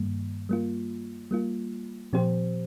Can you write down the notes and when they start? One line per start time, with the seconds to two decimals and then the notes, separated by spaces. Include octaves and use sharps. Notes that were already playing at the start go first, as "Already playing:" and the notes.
Already playing: G2 D#3 G3 A#3
0.49 G3 A#3 F4
1.31 G3 A#3 F4
2.13 A#2 F3 C4 G4 C5